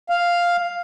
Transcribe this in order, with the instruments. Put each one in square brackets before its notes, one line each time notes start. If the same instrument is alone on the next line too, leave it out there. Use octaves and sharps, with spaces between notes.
[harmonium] F5